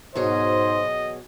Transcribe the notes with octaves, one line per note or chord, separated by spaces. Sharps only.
G#2 B2 F#3 G#4 C5 D#5